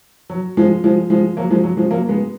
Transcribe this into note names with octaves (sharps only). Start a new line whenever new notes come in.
F#3
F3 G#3
F3 G#3
F3 G#3
F#3 A#3
F3 G#3
F#3
F3 G#3
F#3 A#3
G#3 B3